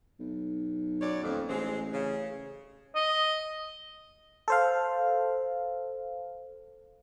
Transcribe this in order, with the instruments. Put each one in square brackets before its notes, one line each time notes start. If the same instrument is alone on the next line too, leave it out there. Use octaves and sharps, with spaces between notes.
[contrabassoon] B1
[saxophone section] F#2 C#5 D5
[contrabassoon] D#1 [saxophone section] F2
[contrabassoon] A1 [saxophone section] G#3 C4
[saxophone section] C#3
[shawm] D#5
[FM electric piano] A4 C5 F5